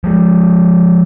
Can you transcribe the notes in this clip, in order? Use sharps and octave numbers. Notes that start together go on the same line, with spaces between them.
F3 G#3